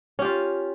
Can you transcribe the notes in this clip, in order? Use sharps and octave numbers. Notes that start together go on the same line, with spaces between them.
C#4 F4 G4